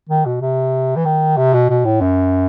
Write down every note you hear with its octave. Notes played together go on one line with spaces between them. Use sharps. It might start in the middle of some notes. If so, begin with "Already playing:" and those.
D#3
B2
C3
E3
D#3
C3
B2
B2
A2
F#2